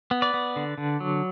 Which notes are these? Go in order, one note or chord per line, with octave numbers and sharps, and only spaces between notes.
B3
B4 D5
B3
D3
D3
F#3